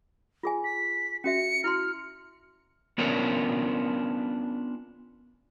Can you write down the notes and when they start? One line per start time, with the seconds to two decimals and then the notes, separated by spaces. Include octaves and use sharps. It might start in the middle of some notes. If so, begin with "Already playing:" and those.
0.43 F4 G#4 G#5
0.64 B6
1.24 C#4 F#4 E5 C#7
1.64 E4 F#4 C6 F6
2.98 B3 C#4 D4 F4 A#4 C#5